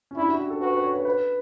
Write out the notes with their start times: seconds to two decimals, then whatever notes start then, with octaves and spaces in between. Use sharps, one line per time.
0.11 C#4
0.17 D4 E4
0.29 F#4
0.40 G4
0.50 A4
0.61 F#4 B4
0.72 B4
0.84 C#5
0.94 B4
1.05 B4